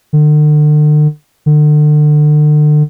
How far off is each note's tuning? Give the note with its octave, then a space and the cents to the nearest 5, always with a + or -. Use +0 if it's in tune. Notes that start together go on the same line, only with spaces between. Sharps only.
D3 +40
D3 +35